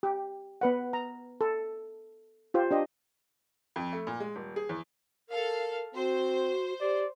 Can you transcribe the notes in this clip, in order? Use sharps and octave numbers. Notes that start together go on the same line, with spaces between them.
G4
B3 B4 F#5
A#5
A4
F4 G4 C5
D4 G4 D#5
F2
A3
A#2
G#3
D#1
G#4
E2
A4 A#4 F5
C4 F#4 C5
G4 D5